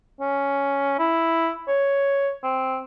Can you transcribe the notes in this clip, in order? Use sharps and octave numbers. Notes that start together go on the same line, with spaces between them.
C#4
E4
C#5
C4